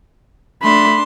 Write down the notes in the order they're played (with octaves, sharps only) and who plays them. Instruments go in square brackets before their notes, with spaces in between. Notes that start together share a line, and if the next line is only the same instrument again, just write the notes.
[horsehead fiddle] A3 B5 [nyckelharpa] D4 C6